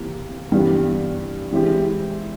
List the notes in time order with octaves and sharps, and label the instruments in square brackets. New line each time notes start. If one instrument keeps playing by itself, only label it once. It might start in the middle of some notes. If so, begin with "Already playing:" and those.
Already playing: [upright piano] C3 E3 A#3
G2 E3 G3 B3
E3 G#3 C4 E4 G4